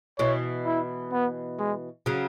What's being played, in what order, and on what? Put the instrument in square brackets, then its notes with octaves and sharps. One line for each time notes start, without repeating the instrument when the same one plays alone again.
[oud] B2 E3 [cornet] C#5
[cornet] E4
B3
G#3
[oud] C#3 F#3